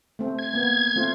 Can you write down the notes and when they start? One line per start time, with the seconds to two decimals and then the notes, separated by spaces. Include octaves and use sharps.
0.19 A3 C4
0.39 G#6
0.54 A#3 B3
0.96 A3 C4 F4